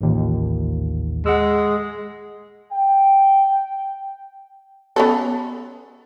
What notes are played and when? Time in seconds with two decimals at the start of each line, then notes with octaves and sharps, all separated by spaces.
0.01 A1 D#2 A#2
1.26 G#3 F#5 E6
2.73 G5
4.96 B3 C#4 A4